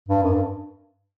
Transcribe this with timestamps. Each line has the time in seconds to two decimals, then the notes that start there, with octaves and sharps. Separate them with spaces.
0.09 G2
0.23 F#2
0.33 G2